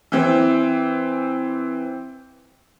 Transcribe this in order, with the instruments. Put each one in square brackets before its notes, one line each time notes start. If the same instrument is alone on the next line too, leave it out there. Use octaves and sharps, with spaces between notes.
[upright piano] E3 C4